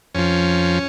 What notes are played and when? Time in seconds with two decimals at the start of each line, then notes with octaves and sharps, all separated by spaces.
0.15 F2 F3 C#4